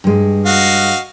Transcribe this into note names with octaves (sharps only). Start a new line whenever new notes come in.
G2 G#3
F#4 D#5 F5